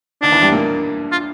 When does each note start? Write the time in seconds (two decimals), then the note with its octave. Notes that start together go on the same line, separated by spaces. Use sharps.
0.22 D#2 D#3 D4
0.32 E2 E3
0.42 G2 G3
0.52 A#2 A#3
1.12 F4